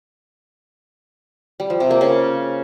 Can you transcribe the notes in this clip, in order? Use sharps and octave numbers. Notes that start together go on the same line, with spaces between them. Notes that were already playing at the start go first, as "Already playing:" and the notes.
G3
F3
C3
A#3
C#3